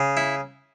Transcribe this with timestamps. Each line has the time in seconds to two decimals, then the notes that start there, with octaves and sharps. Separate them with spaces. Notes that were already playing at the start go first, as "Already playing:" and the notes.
Already playing: C#3
0.17 E4